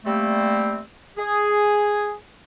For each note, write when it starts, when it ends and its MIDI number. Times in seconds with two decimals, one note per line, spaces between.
0.05 0.79 55
0.05 0.79 57
0.05 0.79 58
0.05 0.79 60
1.18 2.13 68